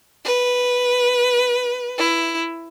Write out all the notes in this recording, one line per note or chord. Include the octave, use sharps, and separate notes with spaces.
B4
E4